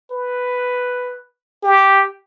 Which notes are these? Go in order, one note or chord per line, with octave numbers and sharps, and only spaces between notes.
B4
G4